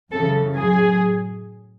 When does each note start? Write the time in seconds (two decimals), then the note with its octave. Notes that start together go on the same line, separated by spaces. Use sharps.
0.11 F#2 C#3 E3 A4
0.56 A2 F#3 G#4